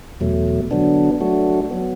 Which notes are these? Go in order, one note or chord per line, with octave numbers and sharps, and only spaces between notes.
E2 B2 F#3 A3
D3 F#3 B3 D4
F#3 A3 D4 F#4
F#3 B3